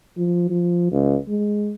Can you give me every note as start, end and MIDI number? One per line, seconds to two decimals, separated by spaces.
0.17 0.47 53
0.50 0.89 53
0.92 1.17 37
1.28 1.74 56